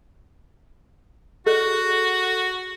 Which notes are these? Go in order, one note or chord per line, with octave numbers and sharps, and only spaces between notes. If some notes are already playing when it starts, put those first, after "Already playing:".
F#4 G#4 A4